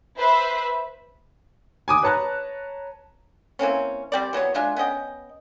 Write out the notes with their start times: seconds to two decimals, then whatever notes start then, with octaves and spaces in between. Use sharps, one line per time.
0.17 B4 C5 E5
1.88 G#5 D6 D#6
2.02 B4 C#5 A5 A#5 F#6
3.59 E3 A#3 C4 C#4
4.12 G3 C4 D5
4.33 E3 F#3 B3 C#5
4.54 G#3 D4 F4 E5
4.77 B3 C#4 D#5 G5